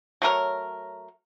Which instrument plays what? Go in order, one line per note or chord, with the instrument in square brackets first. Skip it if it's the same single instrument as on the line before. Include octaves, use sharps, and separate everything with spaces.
[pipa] F#3 A3 A#4 C#5